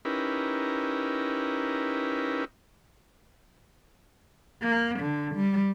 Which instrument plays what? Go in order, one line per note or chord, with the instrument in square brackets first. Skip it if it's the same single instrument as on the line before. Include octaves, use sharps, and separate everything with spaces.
[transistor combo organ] C#4 D#4 E4 G4 A#4 B4
[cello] A#3
D3
G3